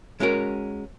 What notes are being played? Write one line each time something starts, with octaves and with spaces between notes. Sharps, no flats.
G#3 C#4 F#4 A#4